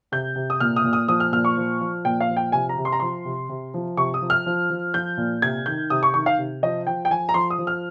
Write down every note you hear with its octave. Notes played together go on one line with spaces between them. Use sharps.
C3 G6
C3
D#6
A#2 F6
D#6
A#2
D#6
F3 D#6
F6
A#2 F6
C#6
F3
F3
A#2 G5
F5
F3
G5
C3 G#5
A#5
C3
C6
A#5
F3 C6
C3
C3
F3
C3 C#6
D#6
F3
F6
F3
F3
F3 G6
A#2
C3 G#6
D#3 G6
C3 D#6
C#6
D#3 C#6
F5
C3
F3 D#5
F3 G5
G5
F3 G#5
A#5
F3 C6
D#6
F3
F6